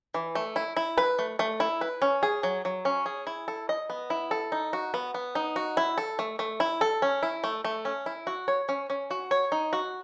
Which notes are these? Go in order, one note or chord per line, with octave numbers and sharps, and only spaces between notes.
E3
A3
E4
E4
B4
A3
A3
E4
B4
C#4
G#4
F#3
F#3
C#4
G#4
E4
A4
D#5
B3
E4
A4
D#4
F#4
B3
B3
D#4
F#4
E4
A4
A3
A3
E4
A4
C#4
E4
A3
A3
C#4
E4
F#4
C#5
C#4
C#4
F#4
C#5
D#4
F#4